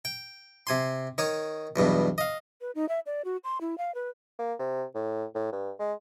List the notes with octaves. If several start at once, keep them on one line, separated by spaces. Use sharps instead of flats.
G5
C3 G#5 C6
D#3 C#5 C#6 D#6
B1 E2 G2 B2
D#5 F5
B4
D#4
E5
D5
F#4
C6
E4
F5
B4
A#3
C3
A2
A2
G2
G#3